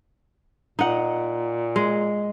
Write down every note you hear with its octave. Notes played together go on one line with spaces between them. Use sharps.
A#2 D#4 F#5
G#3